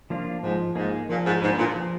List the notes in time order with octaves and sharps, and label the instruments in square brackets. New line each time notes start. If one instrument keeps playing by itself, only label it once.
[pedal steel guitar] F3 A#3 D4 F4
[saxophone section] G#2 [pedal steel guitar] F3
[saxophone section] G#2 [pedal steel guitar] A#3 D#4 G#4
[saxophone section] A#2 [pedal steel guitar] F3
[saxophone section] G#2
[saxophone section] G#2 [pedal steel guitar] A#3 D4 G#4 B4
[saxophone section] A#2
[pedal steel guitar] F3